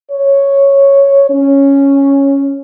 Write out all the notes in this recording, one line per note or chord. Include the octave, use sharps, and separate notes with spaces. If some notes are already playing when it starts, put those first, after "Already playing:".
C#5
C#4